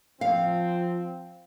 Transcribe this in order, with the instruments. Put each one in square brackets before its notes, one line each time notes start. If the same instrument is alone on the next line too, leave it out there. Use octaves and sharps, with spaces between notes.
[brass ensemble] F3 C4 [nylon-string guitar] F5